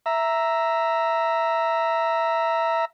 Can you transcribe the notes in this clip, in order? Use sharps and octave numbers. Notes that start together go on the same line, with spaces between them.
E5 A#5